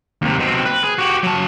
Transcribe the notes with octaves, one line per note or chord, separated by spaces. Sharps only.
D#2 C3
B2 C4
B4
G#4
F#4 G4
F#3 A5